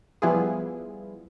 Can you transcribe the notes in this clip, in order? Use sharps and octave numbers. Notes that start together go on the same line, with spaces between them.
F3 G3 B3 E4 F4 G#4